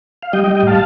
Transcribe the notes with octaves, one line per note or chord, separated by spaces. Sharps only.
F5
G3 D#5 G5
D#5 G5
G3
D#5 G5
A2 F5 A5